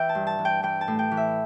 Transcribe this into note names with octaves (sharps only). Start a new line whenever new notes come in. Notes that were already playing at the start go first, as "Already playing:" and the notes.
Already playing: E3 E5 G5
A5
G2
A5
E3
G5
E3 G5
A5
A2
G5
E3
E5